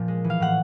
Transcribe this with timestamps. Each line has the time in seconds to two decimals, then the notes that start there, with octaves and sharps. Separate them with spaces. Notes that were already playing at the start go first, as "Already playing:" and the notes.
Already playing: A#2 F3 A#3
0.08 G#3
0.24 E3
0.30 F5
0.40 A2 F#5